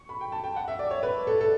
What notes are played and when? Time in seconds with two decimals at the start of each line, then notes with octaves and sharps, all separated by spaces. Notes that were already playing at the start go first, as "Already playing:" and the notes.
Already playing: C#6
0.09 B5
0.21 G5
0.32 A5
0.44 G5
0.56 F#5
0.68 E5
0.79 D5
0.91 C#5
1.03 B4
1.27 A4
1.41 A4